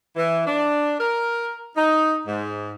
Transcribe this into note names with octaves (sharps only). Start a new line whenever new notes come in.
E3
D4
A#4
D#4
G#2